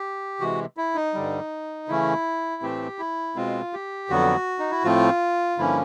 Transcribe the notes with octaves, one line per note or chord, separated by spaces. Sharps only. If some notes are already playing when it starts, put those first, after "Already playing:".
Already playing: G4
C3 E3 G#3 F#4
E4
D#4
G2 D3 G3
C#3 E3 A3 C#4 E4
A2 E3 A3 C4 G4
E4
B2 G#3 C4 F4
G4
F2 D3 F#3 B3 F#4
D#4
E4
A2 F3 A3 C4 F4
G2 D3 F3 A#3 C#4 E4